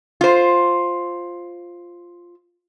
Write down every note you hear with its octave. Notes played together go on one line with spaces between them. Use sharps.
F4 C5